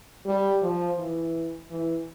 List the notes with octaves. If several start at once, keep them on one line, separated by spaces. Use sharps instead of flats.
G3
F3
E3
E3